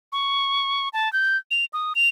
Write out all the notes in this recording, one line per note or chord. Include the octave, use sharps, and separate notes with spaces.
C#6
A5
G6
F7
D#6
F7